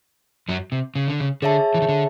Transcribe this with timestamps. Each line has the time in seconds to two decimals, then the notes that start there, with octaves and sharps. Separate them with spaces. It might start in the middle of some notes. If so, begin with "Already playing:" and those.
0.49 F#2 F#3
0.72 C3
0.95 C#3
1.08 D3
1.20 C#3
1.42 D3 G#4 C#5 E5 A5
1.74 E3
1.82 D#3
1.89 D3